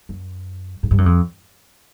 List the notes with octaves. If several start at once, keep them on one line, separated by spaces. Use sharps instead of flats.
F#2
G#2
G2
F#2
F2